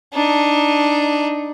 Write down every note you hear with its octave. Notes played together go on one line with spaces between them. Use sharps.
D4 D#4